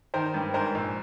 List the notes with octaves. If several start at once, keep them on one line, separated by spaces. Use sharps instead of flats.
D#3 A#4 C5
G2
G#2 A#4 C5
A#1